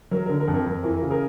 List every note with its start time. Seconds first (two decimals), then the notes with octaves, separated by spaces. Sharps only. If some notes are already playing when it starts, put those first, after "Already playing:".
0.11 F#3 A#4
0.26 A#4
0.29 D3
0.40 A#4
0.48 F2
0.54 A#4
0.66 F2 A#4
0.83 E3 A#4
0.96 A#4
1.02 C#3
1.10 G#4 A#4